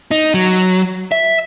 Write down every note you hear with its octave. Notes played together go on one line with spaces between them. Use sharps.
D#4
F#3
E5